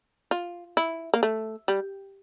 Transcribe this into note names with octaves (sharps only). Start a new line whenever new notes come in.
F4
E4
A#3
A3
G3